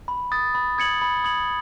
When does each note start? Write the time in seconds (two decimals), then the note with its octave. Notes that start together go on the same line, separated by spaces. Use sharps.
0.08 B5
0.32 D#6 A6
0.55 B5
0.78 D#6 G#6 C#7 F#7
1.02 B5
1.24 D#6 G#6 C#7 F#7